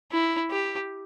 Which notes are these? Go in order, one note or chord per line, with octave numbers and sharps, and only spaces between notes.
E4
G4